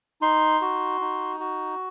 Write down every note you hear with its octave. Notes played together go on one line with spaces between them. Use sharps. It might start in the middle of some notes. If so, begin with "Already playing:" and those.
D#4 C6
F#4
D#4
F#4